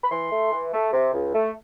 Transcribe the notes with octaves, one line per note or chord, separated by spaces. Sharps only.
B5
E3 C6
A3
E3
A3
C3
C#2
A3